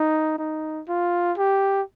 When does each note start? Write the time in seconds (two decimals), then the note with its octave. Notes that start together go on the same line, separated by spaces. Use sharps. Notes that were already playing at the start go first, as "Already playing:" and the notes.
Already playing: D#4
0.38 D#4
0.88 F4
1.37 G4